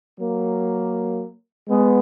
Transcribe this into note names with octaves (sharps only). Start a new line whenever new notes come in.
F#3 A#3
G#3 B3